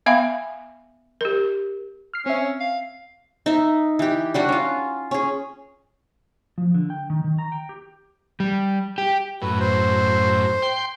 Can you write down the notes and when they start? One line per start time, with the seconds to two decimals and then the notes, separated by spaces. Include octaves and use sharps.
0.06 B3 E5 F5 G#5 B5
1.21 G4 A#4
2.14 F6 C7
2.26 C4 C#4 E5
2.60 F5
3.46 D#4 E5
3.99 E3 G4
4.34 G3 D4 F#4
4.49 C#4 F4
5.11 C#4 G#4
6.58 F3
6.74 D3
6.90 G5
7.10 D#3
7.24 D#3
7.39 A#5
7.52 G5
7.69 G4
8.40 G3
8.98 G4
9.42 F#2 A2 B4
9.60 C5
10.62 G5 C6